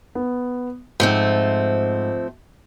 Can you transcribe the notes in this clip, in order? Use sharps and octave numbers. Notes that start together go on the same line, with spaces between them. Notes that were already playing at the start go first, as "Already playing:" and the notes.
B3
G#2 F3 A3 C4